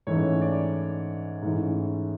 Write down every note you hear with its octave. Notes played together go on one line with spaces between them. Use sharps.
G#2 E3 A3 C#4 C#5
D5
G#2 E3 A3 C#4 E4